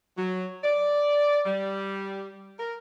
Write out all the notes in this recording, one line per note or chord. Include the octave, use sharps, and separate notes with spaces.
F#3
D5
G3
A#4